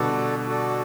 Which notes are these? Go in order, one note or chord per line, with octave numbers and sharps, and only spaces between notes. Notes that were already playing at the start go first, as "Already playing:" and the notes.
Already playing: B2 D3 G3 F#4 A4 D5
F#4 A4 D5